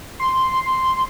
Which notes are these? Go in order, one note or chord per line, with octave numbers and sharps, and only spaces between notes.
C6